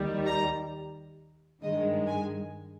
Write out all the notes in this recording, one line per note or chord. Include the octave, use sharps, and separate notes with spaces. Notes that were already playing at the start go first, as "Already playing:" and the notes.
Already playing: D#2 D#3 G3
A#5
G2 D#3 G#3 D#5
G#5